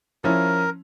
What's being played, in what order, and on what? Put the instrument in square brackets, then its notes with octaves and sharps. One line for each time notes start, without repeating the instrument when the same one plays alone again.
[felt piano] F3 C#4 E4 [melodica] A#4